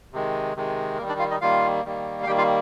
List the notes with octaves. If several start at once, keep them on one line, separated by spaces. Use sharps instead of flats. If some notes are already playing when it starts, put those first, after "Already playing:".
C3 D#3 G#3
C3 D#3 G#3
D#3 G3 A#3 A#4
D4 D5
F4 F5
D#4 D#5
D#3 G3 A#3 F4 F5
D#3 G3 A#3
F5
D#3 G3 A#3 G4 G5
F4 F5